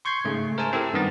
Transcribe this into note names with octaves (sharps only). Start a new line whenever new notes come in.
C6 C#6 G6 G#6 C7
G#2 C#3 A3
A#4 C5 E5 G#5 A5
C4 E4 G4 A4 A#4
G2 D#3 B3 A6